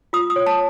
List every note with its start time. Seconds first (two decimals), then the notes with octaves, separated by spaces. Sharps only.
0.13 F4 D#6
0.30 D#6
0.36 C#5
0.46 A5